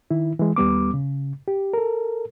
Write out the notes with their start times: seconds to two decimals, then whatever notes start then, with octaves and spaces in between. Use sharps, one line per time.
0.10 D#3 E4
0.39 E3 G#3
0.56 D#2 G3 B3 D6
0.94 C#3
1.48 G4
1.73 A4 A#4